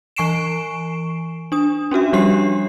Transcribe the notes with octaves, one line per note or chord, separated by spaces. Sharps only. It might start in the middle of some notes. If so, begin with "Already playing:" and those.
E3 G#5 C#6 C7 D7 E7
D4 D#6
C#4 D4 F#4 E5
F3 G3 D4 G4 C6 C7